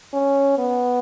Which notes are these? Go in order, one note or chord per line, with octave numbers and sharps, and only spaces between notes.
C#4
B3